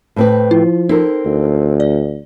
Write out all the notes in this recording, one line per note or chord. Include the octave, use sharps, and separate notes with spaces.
A2 C4 B4
F3 E4
C4 D#4 A4 A#4
D2
D5